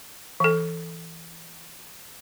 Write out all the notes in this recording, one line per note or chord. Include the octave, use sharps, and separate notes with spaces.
E3 A4